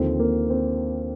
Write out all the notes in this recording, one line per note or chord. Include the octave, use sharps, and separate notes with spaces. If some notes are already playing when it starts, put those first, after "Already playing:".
Already playing: D#2 D3 F3 C4
A#3
C4